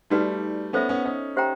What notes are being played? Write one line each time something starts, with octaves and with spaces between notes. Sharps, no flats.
G3 A3 D#4 F#4 B4 D5
B3 C#4 A4 C5 E5
B3 C#4
C#4 D#4
G4 C5 E5 G5 A#5